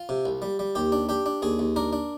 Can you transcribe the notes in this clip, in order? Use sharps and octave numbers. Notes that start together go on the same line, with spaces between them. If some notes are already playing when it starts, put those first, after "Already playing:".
Already playing: F4
C3
C2
G3
G3
D#2 G4
D4
D4 G4
D4
D#2 G#4
D#2
D4 A#4
D4